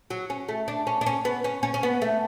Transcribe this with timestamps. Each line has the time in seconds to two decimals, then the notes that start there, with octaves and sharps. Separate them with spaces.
0.10 F#3
0.30 C#4
0.48 A3
0.68 D4
0.87 C#4
1.01 D4
1.06 C#4
1.25 B3
1.44 C#4
1.63 C#4
1.74 C#4
1.83 B3
2.02 A3